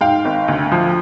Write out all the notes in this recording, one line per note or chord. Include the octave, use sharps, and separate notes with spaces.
G#2 F5 G5
G#1
D2
F3